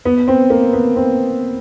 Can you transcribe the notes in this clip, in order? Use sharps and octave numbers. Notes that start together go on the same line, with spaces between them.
B3
C4
A#3
B3
C4